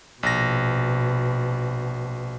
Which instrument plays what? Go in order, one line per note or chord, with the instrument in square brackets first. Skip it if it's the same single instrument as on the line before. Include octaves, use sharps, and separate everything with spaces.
[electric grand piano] A#1 A#6 [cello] B2